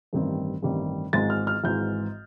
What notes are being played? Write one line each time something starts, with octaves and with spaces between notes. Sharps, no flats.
A1 G2 D#3 G3 C4
A1 G2 D#3 G3 C4
G#1 G#2 E3 G#3 A6
F6
F6
G#1 G#2 E3 G#3 G6